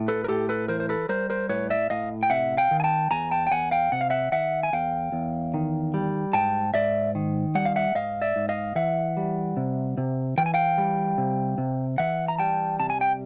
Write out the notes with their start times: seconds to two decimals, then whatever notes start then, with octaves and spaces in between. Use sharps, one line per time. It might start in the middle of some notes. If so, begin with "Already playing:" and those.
Already playing: A2
0.08 A4 B4
0.24 A#4
0.28 A2 G4 A4
0.49 A4 B4
0.68 E3 A#4 C5
0.80 C5
0.89 A4 B4
1.09 G3 A#4 C5
1.30 A#4 C5
1.49 A2 B4 C#5
1.70 D5 E5
1.90 A2 D#5 F5
2.23 G5
2.30 C3 E5 F#5
2.57 F5 G5
2.71 D#3
2.80 G#5
2.84 G5 A5
3.11 E2 G#5 A#5
3.31 G5 A5
3.47 G5
3.51 E2 F#5 G#5
3.71 F5 G5
3.92 C3 F#5
4.01 F5
4.10 E5 F#5
4.32 D#3 E5 F#5
4.63 G#5
4.73 E2 F5 G5
5.12 E2
5.54 D#3
5.94 G3
6.33 G#2 G5 A5
6.74 G#2 D5 E5
7.15 D#3
7.55 G3 F#5
7.65 F5
7.76 E5 F#5
7.95 G#2 D#5 F5
8.21 D5 E5
8.36 G#2
8.49 D#5 F5
8.75 E3 E5 F#5
9.17 G3
9.57 C3
9.97 C3
10.38 E3 G5
10.46 G#5
10.54 F5 G5
10.78 G3
11.18 C3
11.58 C3
11.98 E3 E5 F#5
12.28 A#5
12.38 G3 G5 A5
12.79 C3 A5
12.90 G#5
13.01 G5